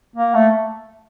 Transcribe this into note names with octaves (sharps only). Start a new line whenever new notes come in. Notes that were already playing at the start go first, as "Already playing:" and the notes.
A#3
A3